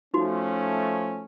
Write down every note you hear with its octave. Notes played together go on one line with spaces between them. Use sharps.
F3 A3 C#4 D#4 F#4